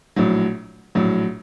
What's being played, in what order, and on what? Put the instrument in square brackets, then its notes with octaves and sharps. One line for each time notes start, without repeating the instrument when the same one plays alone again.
[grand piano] A#1 A2 F#3
A#1 A2 F#3